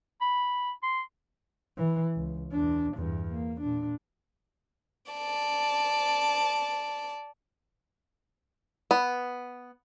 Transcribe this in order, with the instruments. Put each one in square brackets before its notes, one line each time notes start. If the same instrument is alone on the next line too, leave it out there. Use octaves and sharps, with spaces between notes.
[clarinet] B5
C6
[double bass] E3
C#2
E2 D4
E2 G2
A#3
A#2 D4
[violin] D5 A5
[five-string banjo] B3